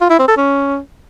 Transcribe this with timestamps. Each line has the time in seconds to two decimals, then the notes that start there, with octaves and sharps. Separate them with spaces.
0.01 F4
0.10 E4
0.19 C4
0.28 A4
0.37 C#4